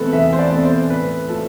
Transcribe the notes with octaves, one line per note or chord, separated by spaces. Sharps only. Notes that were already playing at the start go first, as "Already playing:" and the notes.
Already playing: E2 B2 A3 C4 A4 B4
E2 E5
C5
D5
B2 A3 C4
C5
A2 B4
F3 A3 A4